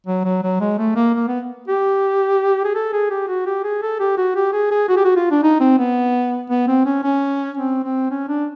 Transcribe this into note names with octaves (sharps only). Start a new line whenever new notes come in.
F#3
F#3
F#3
G#3
A3
A#3
A#3
B3
G4
G#4
A4
G#4
G4
F#4
G4
G#4
A4
G4
F#4
G4
G#4
G#4
F#4
G4
F#4
F4
D4
D#4
C4
B3
B3
C4
C#4
C#4
C4
C4
C#4
D4